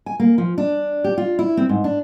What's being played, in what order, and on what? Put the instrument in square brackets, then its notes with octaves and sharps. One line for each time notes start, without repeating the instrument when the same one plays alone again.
[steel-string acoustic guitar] G#5
A#3
F3
D4
G4
F4
E4
C4
G#2
D4